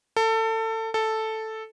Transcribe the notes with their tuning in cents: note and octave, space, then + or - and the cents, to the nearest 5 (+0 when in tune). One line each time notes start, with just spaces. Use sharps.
A4 +25
A4 +0